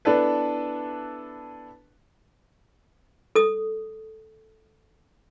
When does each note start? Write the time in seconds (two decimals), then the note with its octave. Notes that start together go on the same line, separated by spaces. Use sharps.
0.05 B3 D4 E4 A4 B4
3.35 A4 D#6